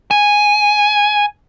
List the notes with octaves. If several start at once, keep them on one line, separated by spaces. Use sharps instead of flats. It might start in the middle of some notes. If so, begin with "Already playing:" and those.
G#5